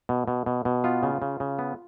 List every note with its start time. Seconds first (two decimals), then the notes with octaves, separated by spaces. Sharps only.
0.09 B2
0.28 B2
0.46 B2
0.65 B2
0.84 B3 F4
1.03 C#3
1.22 C#3
1.40 C#3
1.59 B3